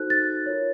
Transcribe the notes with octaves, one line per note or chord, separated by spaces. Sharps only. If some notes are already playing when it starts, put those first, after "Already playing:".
Already playing: D#4 F#4 A4 C5 F#6
A6
F4 A#4 C#5